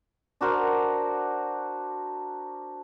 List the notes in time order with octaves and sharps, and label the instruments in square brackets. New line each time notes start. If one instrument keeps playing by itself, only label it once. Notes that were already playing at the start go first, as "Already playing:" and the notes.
[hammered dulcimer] D4 F#4 A#4 C5